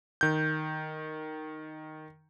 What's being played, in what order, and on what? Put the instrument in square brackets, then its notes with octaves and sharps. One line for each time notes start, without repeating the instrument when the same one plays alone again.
[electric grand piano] D#3 G6